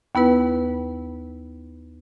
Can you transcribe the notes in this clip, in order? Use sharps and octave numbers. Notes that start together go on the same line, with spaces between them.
D#2 B3 E4 B4